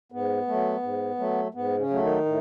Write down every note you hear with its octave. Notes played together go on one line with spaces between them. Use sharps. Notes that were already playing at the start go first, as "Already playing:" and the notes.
G#2 B3
F#3 A3
G#2
F#3 A3
G#2 B3
C#3 C#4
F#3 A3
D#3 D#4
A2